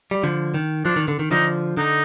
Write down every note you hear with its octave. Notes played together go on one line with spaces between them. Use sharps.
G3
D3 F3
D#3
F3 D4
D#3
D3
D#3
D3 F3 D#4
D3 D#4